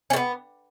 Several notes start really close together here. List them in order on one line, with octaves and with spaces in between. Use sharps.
C#4 A3 B3